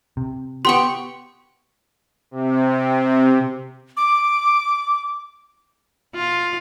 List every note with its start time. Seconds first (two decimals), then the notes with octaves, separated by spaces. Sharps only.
0.17 C3
0.65 B3 G4 G5 C6 C#6
2.31 C3
3.97 D6
6.15 F4